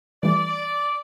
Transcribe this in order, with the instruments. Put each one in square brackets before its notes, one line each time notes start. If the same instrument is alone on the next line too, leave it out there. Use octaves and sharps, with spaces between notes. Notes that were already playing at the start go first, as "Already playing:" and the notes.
[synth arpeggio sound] E3 G3 A3 [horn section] D5